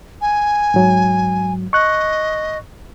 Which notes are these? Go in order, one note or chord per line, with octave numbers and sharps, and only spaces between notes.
G#5
G#2 F#3
D#5 C#6 F#6